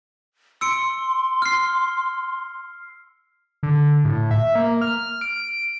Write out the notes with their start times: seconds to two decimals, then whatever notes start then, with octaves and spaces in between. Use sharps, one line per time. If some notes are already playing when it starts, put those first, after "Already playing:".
0.61 C6 E6 C#7 D7
1.42 F6 C7
3.63 D3
4.04 A2
4.31 E5
4.55 A#3
4.81 F6
5.21 D7